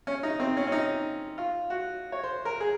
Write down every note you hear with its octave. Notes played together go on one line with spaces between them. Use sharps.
C#4
D#4
C4
C#4
C#4
D#4
F4
F#4
C#5
C5
A#4
G#4